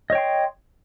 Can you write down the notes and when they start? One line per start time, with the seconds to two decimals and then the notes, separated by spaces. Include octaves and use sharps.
0.10 D#5
0.12 C#5
0.15 G5
0.18 C6